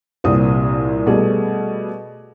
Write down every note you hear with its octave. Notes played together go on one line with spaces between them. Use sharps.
C2 A#2 C4 D#6
B2 G3 A3 G#4